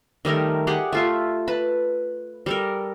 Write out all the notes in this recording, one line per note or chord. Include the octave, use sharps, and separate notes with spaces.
D#3 G3 A3 A#4
G4 G#4 D5 F#5
A3 F4 E5
B4 A5 B5
G3 A4 A#4